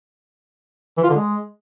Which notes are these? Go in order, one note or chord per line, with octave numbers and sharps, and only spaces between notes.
E3
F4
D3
G#3